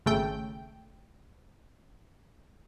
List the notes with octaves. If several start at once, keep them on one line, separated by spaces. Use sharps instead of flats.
G#1 C#3 A3 G5